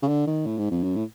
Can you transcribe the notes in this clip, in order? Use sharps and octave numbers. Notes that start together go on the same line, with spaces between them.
C#3
D3
D#3
A2
G#2
F2
F#2
A2